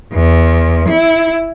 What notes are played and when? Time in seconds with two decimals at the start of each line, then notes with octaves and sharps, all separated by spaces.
0.13 E2
0.89 E4